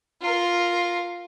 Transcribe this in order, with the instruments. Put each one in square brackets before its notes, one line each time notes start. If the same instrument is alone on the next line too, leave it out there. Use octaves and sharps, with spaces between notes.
[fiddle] F4 A#4